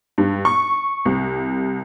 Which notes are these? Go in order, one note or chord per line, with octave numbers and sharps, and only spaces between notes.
G2
C#6
C2